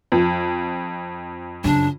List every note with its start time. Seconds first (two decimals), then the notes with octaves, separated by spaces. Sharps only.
0.12 F2
1.64 F#2 C#3 D4